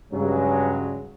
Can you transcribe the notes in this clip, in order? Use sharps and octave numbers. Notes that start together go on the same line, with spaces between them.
G2 C#3 F#3 G#3